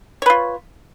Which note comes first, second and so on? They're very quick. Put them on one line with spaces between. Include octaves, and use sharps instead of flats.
C#5 B4 F4